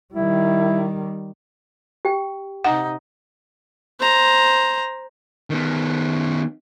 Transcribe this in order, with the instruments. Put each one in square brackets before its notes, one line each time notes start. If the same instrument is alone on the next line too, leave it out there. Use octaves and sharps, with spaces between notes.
[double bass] D#3 G3 [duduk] E4
[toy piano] G4 G5
[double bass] C3 D#4 [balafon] F#5
[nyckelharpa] C5 A#5
[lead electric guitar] D#3 B3